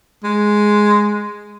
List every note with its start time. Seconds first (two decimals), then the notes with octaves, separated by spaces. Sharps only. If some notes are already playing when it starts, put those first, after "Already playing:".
0.24 G#3